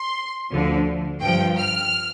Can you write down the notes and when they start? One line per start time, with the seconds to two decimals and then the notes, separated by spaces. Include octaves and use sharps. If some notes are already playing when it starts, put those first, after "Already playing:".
Already playing: C6
0.51 D2 D3 F3
1.22 G2 F3 G5
1.58 F6